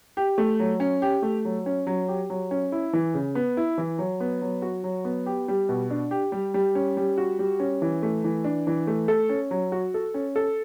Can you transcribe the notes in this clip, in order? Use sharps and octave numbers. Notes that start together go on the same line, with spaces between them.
G4
A3
F#3
C#4
G4
A3
F#3
C#4
F#3
G4
F#3
C#4
E4
E3
C#3
B3
E4
E3
F#3
B3
F#3
F#4
F#3
B3
G4
G3
B2
D4
G4
G3
G3
C#4
G3
F#4
G3
C#4
E3
A3
E3
D4
E3
A3
A4
C#4
F#3
F#4
A4
C#4
A4